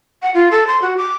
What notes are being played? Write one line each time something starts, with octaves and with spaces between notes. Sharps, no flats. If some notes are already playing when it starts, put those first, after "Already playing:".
F#5
F4
A4
C6
F#4
D6